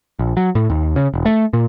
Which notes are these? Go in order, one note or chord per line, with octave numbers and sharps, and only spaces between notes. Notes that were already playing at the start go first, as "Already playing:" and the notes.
A#1
F#3
A2
D#2
C#3
E1
A3
A#2